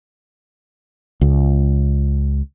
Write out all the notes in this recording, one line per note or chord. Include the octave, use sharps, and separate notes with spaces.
C#2